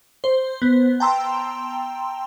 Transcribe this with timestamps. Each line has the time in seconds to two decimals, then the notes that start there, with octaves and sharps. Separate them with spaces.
0.24 C5
0.62 B3
1.00 G5 A5 A#5 C6 E6